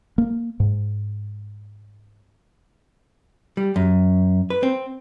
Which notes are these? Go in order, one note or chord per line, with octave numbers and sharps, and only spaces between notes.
A#3
G#2
G3
F#2
B4
C4